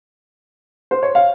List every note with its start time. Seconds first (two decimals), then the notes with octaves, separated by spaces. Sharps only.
0.91 C5
1.03 C#5
1.15 F5